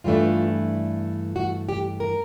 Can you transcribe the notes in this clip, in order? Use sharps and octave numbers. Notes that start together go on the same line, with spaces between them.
G2 E3 A3 D4 F4
F#4
G4
A#4